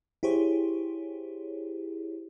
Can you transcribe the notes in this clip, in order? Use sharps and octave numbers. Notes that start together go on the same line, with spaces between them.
E4 G4 G#4 C5 C#5